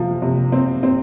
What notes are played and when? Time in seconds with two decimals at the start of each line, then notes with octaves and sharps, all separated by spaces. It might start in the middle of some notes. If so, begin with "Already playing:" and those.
Already playing: C3 F3
0.22 C3
0.52 C4
0.83 C4